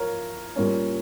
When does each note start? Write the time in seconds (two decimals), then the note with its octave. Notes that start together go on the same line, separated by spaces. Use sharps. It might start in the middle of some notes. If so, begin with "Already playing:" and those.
Already playing: F3 A#4 C#5 F5
0.56 A#2 G3 A#3 C#4